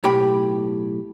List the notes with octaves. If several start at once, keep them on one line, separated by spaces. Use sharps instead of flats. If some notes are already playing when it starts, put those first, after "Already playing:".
B1 A2 G4 G5 B5